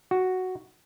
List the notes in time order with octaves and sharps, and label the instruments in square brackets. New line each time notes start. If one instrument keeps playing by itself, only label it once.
[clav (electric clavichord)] F#4